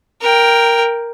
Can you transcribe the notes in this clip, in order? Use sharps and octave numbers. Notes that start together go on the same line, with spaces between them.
A#4 G5